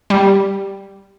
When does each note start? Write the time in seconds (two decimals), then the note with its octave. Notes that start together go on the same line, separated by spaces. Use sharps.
0.10 G3